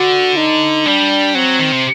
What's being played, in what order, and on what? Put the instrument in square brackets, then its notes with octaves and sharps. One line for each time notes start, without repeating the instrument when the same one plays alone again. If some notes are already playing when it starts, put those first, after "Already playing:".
Already playing: [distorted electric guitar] D3 [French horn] F#4
[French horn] D#4
[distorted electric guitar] G3 [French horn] D4
[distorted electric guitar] F#3 [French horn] C4
[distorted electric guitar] D#3
C3